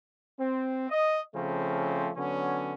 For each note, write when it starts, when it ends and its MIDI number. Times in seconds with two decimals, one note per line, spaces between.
0.39 0.87 60
0.90 1.20 75
1.34 2.10 49
1.34 2.10 53
1.34 2.10 57
1.34 2.10 60
1.34 2.10 61
2.17 2.74 50
2.17 2.74 54
2.17 2.74 59
2.17 2.74 61